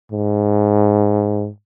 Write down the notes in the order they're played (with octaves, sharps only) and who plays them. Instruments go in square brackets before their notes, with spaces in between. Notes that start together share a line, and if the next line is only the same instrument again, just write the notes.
[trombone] G#2